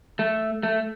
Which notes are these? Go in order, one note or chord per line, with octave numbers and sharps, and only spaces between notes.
A3
A3